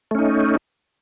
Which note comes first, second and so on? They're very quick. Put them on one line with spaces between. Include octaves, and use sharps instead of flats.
A3 C#4 D#4